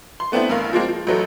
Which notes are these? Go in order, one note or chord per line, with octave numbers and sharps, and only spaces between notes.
C6
A3 B3 C4 D4 E4
A1 G2 A#4 F5
F3 G#3 A#3 C4
F3
A1 F#3 A3